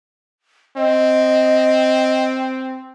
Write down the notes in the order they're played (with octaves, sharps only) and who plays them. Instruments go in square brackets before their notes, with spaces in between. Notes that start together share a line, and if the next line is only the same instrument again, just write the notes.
[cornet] C4 [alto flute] D#5